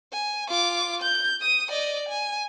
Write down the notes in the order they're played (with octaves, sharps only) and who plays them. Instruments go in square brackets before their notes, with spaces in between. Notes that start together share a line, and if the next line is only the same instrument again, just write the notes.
[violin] G#5
F4 D6
G6
D#6 D#7
D5 D#5
G#5